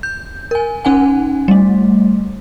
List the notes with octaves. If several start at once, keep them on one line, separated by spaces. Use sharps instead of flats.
G6
A#4 G#5
C#4 D#4 F#5 G#5
G3 A3